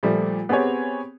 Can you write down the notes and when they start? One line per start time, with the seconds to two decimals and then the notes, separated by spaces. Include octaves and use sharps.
0.03 A#2 F3 G3 A3
0.49 B3 C4 G4 G#4 C#5